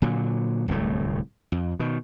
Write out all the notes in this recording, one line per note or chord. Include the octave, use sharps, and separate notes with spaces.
A#2 D3 F#3
D1 C2 F#2 A3
F2
B2 D#3